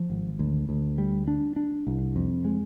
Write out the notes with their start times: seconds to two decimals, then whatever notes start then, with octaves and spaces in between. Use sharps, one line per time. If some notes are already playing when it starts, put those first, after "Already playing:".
Already playing: F3
0.10 G#1
0.39 D2
0.69 D2
0.98 G3
1.27 D4
1.56 D4
1.87 C2
2.16 F2
2.45 G#3